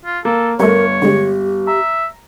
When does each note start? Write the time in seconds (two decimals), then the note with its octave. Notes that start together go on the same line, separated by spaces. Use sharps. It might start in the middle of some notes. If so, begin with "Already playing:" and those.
0.05 F4
0.25 A#3 A4
0.60 G1 G3 A3 A#4 C#5
1.02 D3 G#3 G4
1.67 E5 A#5